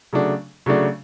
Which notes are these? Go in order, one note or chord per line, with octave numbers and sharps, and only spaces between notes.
C#3 F#3 A3 D4
C#3 F#3 A3 D4